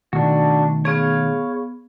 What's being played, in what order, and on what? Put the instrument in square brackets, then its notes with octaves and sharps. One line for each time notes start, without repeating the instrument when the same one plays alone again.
[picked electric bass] B2 D#3 A3 [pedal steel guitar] D4 F#4
[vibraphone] B3 G#4 [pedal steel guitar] C#5 F5